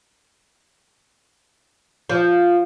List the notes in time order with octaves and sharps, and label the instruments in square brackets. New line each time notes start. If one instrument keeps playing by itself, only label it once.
[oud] F3